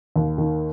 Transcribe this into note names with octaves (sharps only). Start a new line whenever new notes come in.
D#2
D#3